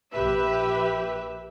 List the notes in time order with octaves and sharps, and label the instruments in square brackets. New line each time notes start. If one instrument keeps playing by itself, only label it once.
[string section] A#1 G4 B4 E5